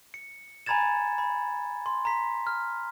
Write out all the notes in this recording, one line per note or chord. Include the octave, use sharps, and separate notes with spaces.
C#7
G#5 A#5 B5 G#6 A6 E7
B5
C6
A#5 C6 B6
F6